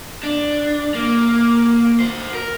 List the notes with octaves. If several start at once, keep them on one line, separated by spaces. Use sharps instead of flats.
D4
A#3
F#4 C5
A#4